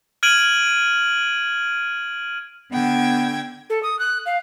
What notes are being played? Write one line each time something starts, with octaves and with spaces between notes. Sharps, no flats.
F6 G#6 D7 D#7 F#7
D3 B3 G5 G#6
A4
D#6
F#6
F5